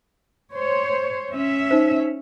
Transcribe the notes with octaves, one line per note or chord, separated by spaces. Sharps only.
C5 C#5
C#4 E5
D#4 C5